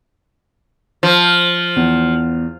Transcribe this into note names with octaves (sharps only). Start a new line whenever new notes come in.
F3
E2